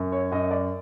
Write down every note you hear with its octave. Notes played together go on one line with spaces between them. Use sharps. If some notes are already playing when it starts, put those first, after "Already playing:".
Already playing: F#2
C#5
F#2 D#5
D5